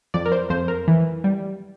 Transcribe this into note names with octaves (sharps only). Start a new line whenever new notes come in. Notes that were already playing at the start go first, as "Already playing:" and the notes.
F2 D5
A#4
C5
F2 C5
A#4
E3
G3